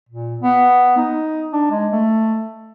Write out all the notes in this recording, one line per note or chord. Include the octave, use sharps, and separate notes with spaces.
A#2
B3
D#4
D4
G#3
A3